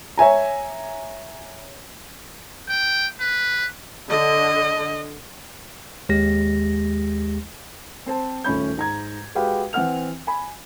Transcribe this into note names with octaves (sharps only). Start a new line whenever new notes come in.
C#5 E5 G#5 A#5
G5
B4
D3 D#5
D#2 G#3 G4 A#6
C4 C5 A5
D#1 A3 C#4 B5 G6
G#2 A#5 G#6
G#3 F#4 G4 B4 F5 G5
E3 C4 F#5 F6 F7
G#5 B5